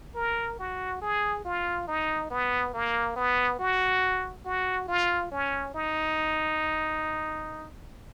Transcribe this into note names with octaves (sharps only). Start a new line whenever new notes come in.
A#4
F#4
G#4
F4
D#4
B3
A#3
B3
F#4
F#4
F4
C#4
D#4